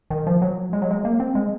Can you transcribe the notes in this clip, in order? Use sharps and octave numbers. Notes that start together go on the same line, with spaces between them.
D#3
F3
F#3
G#3
F#3
G#3
A#3
C4
G#3